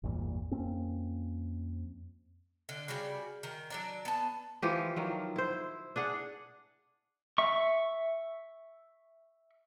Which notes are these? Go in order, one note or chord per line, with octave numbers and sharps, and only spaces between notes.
G#1 E2 G2 A#2
F2 A#3 C4 C#4
D3
C#3 G3 F#4 D5
D#3
F#3 D4 D5
B3 A5
E3 F3 G4
D#3 F3 F#3
E4 C5
D4 G#4 F#5
E5 C#6